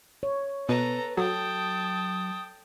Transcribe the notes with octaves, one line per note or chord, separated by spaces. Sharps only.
C#5
B2 A4 B4 A#5
F#3 A4 G5 A5 D#6